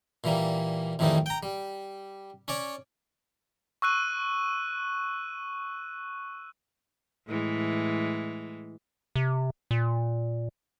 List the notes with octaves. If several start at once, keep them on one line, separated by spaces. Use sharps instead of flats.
A#2 E3 G3 A#3
F2 A2 D#3 E3 G3 D#4
G5 A#5
G3
C#4 C#5 D5
C#6 E6 F#6 D#7
A2 E3 G#3
C3
A#2